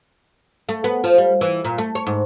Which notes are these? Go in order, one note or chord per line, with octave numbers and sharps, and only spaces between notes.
A3
B3
F3
G3
E3
A#2
A3
C#5
G#2